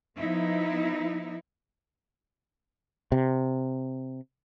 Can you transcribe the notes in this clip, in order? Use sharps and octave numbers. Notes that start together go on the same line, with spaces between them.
F3 B3 D#4 E4
C3